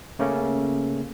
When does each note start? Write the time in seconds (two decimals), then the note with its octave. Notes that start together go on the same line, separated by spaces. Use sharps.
0.19 C#3 A3 A#3 C#4